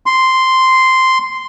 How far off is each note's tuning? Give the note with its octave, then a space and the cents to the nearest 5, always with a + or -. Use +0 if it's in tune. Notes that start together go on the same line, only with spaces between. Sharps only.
C6 -5